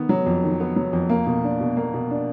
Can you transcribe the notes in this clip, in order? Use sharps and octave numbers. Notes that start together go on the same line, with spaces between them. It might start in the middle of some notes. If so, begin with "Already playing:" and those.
Already playing: D#3 B3
F#3
F2
D#3
B3
F#3
F2
A#3
B2
D4
B2
A#3
B2
D4